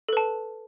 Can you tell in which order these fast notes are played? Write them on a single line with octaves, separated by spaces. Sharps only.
A4 B4 A5